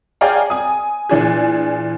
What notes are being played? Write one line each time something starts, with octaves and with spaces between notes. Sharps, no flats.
G#4 C#5 D5 F5 G5 A#5
G#5 D#6
A#2 E3 D4 G#4